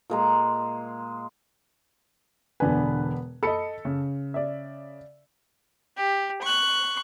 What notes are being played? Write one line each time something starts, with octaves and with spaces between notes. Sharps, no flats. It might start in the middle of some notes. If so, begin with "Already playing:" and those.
A#2 G#3 A#5
E1 D3 B3 D4 B4 G#5
A4 D#5 B5 C#7
C#3
D5 E5
G4
C#6 F#6